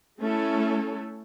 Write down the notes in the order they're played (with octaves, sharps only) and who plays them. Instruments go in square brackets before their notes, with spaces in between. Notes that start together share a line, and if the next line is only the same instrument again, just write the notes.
[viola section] A3 C#4 E4 A4